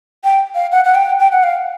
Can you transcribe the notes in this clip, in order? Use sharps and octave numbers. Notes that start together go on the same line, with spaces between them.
G5
F5
F#5
F#5
G5
G5
F#5
F5